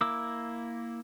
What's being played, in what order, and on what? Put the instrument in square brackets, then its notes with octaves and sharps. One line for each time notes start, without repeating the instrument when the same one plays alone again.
[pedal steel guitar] A#3 E4 D6 E6